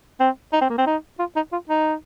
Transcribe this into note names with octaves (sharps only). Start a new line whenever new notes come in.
C4
D#4
C4
A#3
C4
D#4
F4
D#4
F4
D#4